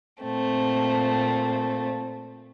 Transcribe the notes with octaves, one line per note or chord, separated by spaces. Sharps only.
A#2 A3 C4